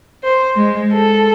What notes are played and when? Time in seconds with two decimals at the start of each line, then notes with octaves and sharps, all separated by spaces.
0.23 C5
0.55 G#3
0.93 A4